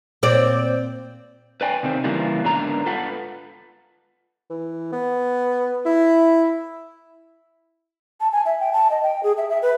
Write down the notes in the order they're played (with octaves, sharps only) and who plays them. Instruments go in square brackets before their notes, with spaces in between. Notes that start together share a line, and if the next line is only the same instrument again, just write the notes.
[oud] A#2 C4 D5
[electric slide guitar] B4 D5 G5 G#5
C3 D#3 C4
C#3 E3 G3 A#3 F4
G#2 D3 B3 D4 A#4 A#5
F4 A4 B4 F#5
[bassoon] E3
B3
E4
[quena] A5
G#5
E5
G5
A5
D#5
G5
G#4
E5
E5
B4